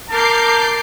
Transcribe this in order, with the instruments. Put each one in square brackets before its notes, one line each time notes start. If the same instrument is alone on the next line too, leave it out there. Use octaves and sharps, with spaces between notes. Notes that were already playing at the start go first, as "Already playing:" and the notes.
[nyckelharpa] A#4 [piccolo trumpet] A5 [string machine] D6 G6 C7